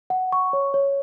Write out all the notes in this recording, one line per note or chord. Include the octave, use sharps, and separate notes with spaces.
F#5
C#6
C#5
C#5